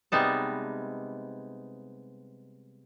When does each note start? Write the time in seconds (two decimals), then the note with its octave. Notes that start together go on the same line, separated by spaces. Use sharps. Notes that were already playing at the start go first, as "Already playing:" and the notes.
0.12 C3 G3 G#3 B3 D#4 A5